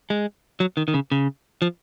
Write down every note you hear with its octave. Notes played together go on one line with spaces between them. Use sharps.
G#3
F#3
D#3
D#3
C#3
C#3
F3